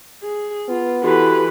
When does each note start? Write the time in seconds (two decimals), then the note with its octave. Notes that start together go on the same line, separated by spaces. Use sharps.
0.23 G#4
0.69 B3 F4
1.04 E3 F#4 G4 A4 B4